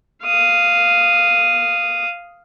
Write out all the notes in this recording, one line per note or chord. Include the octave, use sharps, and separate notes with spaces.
F5 D#6